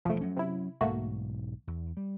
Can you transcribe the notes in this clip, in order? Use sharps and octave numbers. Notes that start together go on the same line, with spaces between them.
E1 D#3 F3 A3
F#3 C#4
C3 E4
B1 G#2 A3 A#3 F#4
E2
G3